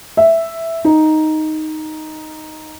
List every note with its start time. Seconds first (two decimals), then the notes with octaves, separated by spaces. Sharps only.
0.17 E5
0.85 D#4